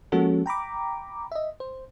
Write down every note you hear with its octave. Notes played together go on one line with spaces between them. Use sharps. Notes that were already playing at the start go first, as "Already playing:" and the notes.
F3 G#3 A#3 C#4 F#4 A4
G5 A#5 B5 D6
D#5 E5
C5